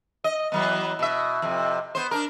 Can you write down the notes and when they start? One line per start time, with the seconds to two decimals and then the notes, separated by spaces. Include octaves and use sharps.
0.24 D#5
0.52 E3 F#3 B3
0.99 B2 E5
1.42 F2 C3
1.95 B3 C5
2.11 D4 A#4